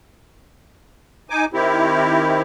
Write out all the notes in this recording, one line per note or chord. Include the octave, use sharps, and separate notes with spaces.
D#4 G#5 D6
D#3 C4 E4 G4